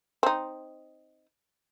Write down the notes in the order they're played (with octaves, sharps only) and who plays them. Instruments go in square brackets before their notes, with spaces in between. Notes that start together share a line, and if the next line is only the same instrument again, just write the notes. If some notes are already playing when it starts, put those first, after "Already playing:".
[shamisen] C4 D#4